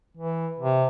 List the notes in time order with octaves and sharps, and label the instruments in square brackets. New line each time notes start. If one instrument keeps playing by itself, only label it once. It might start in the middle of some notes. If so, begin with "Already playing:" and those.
[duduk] E3
C3